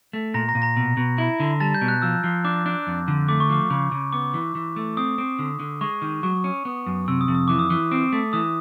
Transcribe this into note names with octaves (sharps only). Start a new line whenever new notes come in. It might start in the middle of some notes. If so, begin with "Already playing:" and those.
A3
A#2 A#5 A#6
A#5 A#6
A#2
A#5 A#6
B2
B2
E4
D3
G3 A5 A6
G6
B2
F#6
F3 E6
F3
D4 D6
D4
F2
D3
A3 D6
C#6
F3 D6
C#3
C#3
B3 D6
E3
E3
A3
C4 D#6
C4
D3
D3
G#3 C#6
D#3
F#3 C#6
C#4
B3
F#2
C3 E6
D#6
F2
D#6
E3 D6
D#6
E3
C4
A3
E3 D#6